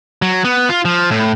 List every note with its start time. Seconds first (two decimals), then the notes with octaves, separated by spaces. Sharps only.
0.22 F#3
0.44 B3
0.69 F4
0.85 F3
1.11 A2